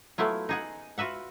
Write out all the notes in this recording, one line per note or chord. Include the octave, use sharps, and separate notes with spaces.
F#3 A3 B3 E4 F4
D#4 G#4 F#5
F4 F#4 B4 E5 F#5